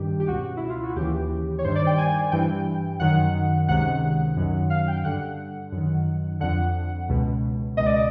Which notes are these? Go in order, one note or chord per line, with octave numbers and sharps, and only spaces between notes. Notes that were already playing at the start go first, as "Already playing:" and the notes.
Already playing: G2 D#3 G4
G4
C#2 B2 F#4
E4
F4
F#4
D#2 C#3 E3 G4
C#5
G2 D#3 C5
D5
G5
G#5
G2 E3 G5
F#2 D#3 F#5
C#2 C3 D#3 F#5
F#2 D#3
F5
G5
G2 D3 F#5
F#2 D#3
F2 D3 F#5
C#2 B2
C#2 B2 D#5
D5
D#5